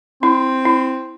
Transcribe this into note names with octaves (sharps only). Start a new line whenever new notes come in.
C4 E4
E4